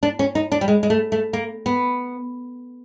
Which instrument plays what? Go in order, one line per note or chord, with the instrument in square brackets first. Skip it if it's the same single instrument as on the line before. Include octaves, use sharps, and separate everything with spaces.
[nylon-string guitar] D4
C#4
D#4
D4
G3
G#3
G#3
A3
A3
A#3
B3